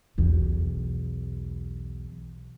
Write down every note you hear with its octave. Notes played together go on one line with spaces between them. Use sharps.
B1 E2